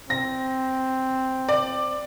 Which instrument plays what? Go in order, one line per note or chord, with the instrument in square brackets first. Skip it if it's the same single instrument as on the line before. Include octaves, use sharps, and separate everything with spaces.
[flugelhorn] C4 [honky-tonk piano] A#6
[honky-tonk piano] D5